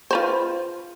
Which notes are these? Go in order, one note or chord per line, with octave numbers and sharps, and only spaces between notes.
F4 B4 C5